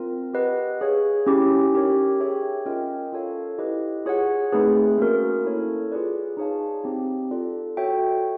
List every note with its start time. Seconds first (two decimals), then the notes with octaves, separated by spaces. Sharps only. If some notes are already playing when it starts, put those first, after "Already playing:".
Already playing: C4 F4 A#4
0.33 G4 B4 D#5 F#5
0.81 G#4 C#5 F5
1.27 C#4 E4 G4
1.73 D#4 G4 A#4 C#5
2.20 G#4 C#5 E5 G5
2.66 C#4 F4 A#4 D#5 G5
3.13 F4 A4 C#5 F5
3.59 E4 G4 B4 D#5
4.06 F4 G#4 C#5 F#5
4.52 A3 C4 D#4 G#4 B4
4.98 A#3 C#4 F#4 A#4
5.45 E4 A4 C#5
5.92 F4 G#4 B4 D5
6.37 D#4 G#4 C#5 F5 A5
6.84 C4 D#4 G4
7.31 F4 A4 D5
7.77 F#4 A4 C#5 E5 G5